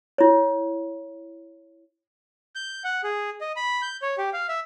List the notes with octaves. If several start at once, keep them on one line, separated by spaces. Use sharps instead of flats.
E4 C#5
G6
F#5
G#4
D#5
B5
G6
C#5
G4
F5
E5